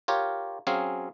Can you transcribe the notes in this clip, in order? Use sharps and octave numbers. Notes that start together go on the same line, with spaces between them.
F4 G4 A#4 C#5
F#3 C4 C#4 G#4 F5